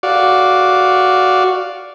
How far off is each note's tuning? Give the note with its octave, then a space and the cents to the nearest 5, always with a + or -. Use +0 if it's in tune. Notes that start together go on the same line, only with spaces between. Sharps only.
F#4 +0 D5 -5 F5 +0